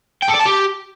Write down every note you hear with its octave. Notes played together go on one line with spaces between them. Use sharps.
G5
A4
D5
A5
G4